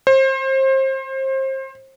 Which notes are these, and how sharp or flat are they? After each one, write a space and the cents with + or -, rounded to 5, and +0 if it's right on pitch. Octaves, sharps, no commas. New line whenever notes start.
C5 +30